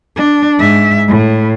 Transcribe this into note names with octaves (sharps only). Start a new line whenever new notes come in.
D4
G#2 E5
A2